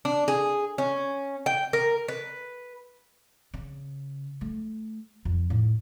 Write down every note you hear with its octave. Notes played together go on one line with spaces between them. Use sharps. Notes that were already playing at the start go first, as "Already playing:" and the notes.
D4
G#4
C#4
G5
A#4
B4
C#3
A3
F2
A2